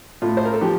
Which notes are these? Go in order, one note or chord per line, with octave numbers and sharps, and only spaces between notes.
A2 F4
C5
A#4
A4
F3 G4